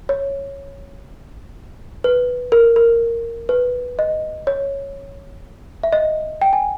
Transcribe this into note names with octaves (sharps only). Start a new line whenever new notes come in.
C#5
B4
A#4
A#4
B4
D#5
C#5
E5
D#5
G5
G#5